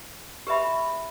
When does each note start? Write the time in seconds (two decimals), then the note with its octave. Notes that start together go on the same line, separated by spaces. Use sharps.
0.47 G4 B4 E5 B5